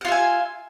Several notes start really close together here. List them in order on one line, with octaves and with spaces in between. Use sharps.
F#5 F4 E5 G#5